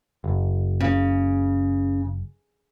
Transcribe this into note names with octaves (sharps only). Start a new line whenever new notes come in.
F#1
C#3